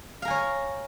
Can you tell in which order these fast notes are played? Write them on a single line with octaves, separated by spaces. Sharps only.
F5 A#4 G#5 C#5